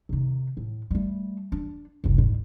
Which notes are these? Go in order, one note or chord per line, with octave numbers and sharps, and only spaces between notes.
C3 D#3
A2
G3 A3
D4
F#1 C2
D2 G#2